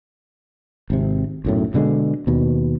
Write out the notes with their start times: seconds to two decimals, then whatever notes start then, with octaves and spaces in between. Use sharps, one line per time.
0.90 G#1 C3
1.45 B1 F#2 A2
1.74 B2 D3 G3 G#3
2.27 D#2 B2